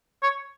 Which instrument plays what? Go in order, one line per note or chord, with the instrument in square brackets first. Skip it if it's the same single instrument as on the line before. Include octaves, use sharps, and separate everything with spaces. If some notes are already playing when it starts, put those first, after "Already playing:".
[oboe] C#5